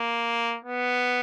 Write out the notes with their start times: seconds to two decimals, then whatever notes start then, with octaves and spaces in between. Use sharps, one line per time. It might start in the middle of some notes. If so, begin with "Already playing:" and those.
Already playing: A#3
0.65 B3